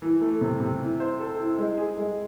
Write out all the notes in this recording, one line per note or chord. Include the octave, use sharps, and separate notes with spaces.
E3
A3
C3
C3
E4
C5
A4
E4
G#3
G#4
G#3